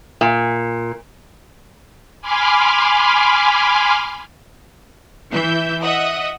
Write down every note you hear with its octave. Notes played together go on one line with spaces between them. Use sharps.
A#2
G#5 B5 C6 D6 F6
E3 E5 G6
D#5 E5 F#5 D#6